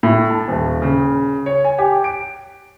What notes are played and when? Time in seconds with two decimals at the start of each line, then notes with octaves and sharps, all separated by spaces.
0.03 A2
0.30 A5
0.48 D#1
0.82 C#3
1.46 C#5
1.64 G#5
1.79 G4
2.04 D7